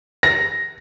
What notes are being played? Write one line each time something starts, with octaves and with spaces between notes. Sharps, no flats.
A#6